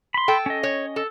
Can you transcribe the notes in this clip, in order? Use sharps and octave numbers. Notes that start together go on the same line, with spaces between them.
B5 C6
A4 G5
C#4 D#5
C#5
A4